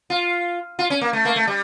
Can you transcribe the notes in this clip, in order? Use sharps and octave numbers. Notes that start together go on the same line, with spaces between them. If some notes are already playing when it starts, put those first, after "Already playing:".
F4
F4
C#4
A#3
A3
A#3
A3
G3